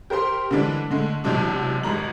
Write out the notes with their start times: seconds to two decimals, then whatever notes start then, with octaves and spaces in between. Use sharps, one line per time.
0.10 G4 A#4 C5 C6
0.51 D3 E3 G3 G#3 D4
0.91 D3 G#3 A3
1.24 B1 E2 C3 F#3 G#3 D4
1.83 G#1 G3 G#3 A#5 F#7